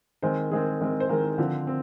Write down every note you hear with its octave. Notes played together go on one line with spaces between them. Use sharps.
D#3 G#3 C4 C5
D#3 G#3 C4 G#4
D#3 G#3 C4
C5
D#3 G#3 C4 A#4
D3 F3 C4
C4